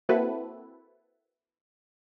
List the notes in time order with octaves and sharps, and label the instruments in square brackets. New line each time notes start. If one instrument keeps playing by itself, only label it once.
[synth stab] A#3 C4 E4 F#4 A4 B4